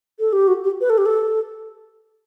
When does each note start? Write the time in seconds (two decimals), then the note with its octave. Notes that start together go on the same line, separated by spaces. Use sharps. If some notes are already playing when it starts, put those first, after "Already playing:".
0.20 A4
0.33 G4
0.48 F#4
0.64 G4
0.81 B4
0.90 A4
0.98 G4
1.06 A4